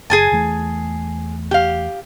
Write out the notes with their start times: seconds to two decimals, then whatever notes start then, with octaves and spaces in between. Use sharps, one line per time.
0.10 F#1 G#4 G#5 A5
0.32 E2 E3 A3
1.51 G4 F5